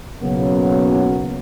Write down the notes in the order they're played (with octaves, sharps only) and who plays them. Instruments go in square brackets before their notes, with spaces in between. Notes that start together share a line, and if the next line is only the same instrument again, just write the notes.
[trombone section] B1 C#3 F#3 A#3 B3